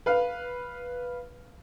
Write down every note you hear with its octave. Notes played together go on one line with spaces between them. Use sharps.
B4 F5